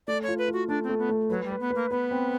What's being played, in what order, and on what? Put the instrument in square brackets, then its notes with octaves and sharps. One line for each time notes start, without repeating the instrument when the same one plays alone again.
[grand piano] A3 [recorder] D5
[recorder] C#5
[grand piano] F4
[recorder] B4
[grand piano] F4 [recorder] F#4
[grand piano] A3 [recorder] D4
[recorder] C4
[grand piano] A3
[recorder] B3
[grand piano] A3
[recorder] F#3 [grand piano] B4
[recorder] G3
[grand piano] B4
[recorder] B3
[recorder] A#3 [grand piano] B4
[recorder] B3 [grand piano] B4
[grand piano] C4